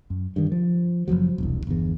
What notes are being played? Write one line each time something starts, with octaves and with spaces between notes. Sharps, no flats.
F#2
G2 D#3
F3
F#1 E2 F3 F#3
E1 C2
G1 E2